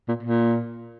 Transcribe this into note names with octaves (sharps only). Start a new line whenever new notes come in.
A#2
A#2